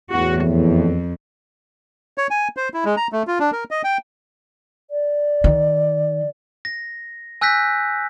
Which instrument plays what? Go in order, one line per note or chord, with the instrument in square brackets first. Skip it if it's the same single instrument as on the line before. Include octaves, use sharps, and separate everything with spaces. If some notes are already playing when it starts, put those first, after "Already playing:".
[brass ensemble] E2 A2 [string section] F#4
[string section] F2
[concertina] C#5
G#5
C5
E4
G#3
A#5
A3
F4
D4
A#4
D#5
G5
[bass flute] D5
[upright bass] D#3
[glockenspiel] A#6
G#5 E6 F#6 G6 A#6 B6